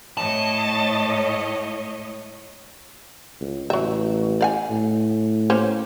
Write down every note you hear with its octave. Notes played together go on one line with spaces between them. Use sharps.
A2 C#5 D#5 A5
C#2
A1 F#3 E5
D5 F5 G#5
A2
A#3 C#4 C5